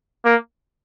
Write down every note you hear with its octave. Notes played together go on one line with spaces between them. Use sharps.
A#3